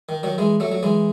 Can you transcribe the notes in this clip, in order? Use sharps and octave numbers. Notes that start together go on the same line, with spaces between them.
D#3
D#3 F#3
E3 G#3
F#3 A3
F#3
E3 G#3